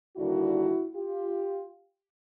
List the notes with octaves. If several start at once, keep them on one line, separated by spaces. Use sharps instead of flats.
D#2 D3 G3 A#3 E4 F#4
F4 G4